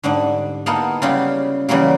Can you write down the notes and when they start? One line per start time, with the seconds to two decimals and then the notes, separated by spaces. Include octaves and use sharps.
0.03 G#2 D3 G3 D4
0.66 A#3 B3 D#4 E4 A4 A#4
1.02 C#3 F#3 G3 E4 F4 G4
1.69 C#3 E3 F#3 G3 A#3